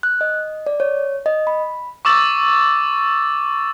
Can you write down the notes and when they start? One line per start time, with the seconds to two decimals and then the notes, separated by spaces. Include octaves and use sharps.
0.03 F#6
0.21 D#5
0.66 D5
0.80 C#5
1.26 D#5
1.47 B5
2.05 C#6 D6 E6 A6